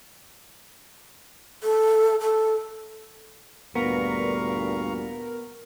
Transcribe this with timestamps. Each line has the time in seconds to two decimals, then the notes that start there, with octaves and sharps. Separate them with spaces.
1.63 A4
2.20 A4
3.75 D2 G2 A#2 B3 A#4 F5 A#5 C#6